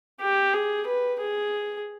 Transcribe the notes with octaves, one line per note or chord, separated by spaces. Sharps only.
G4
G#4
B4
G#4